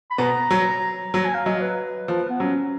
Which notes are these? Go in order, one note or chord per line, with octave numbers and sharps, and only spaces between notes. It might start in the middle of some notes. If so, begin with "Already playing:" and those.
B5
B2 B3 A#5
F#3
F#3 A#5
G#5
F5
F#3 D#5
B4
F3
B3
F#3 C#4